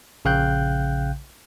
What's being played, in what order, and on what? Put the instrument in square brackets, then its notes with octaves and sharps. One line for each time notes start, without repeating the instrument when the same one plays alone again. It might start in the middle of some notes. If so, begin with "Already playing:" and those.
[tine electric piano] A#1 C#3 F5 G5 F#6 G6